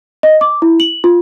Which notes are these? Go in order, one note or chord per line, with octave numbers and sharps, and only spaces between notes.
D#5
D6
E4
F#7
F4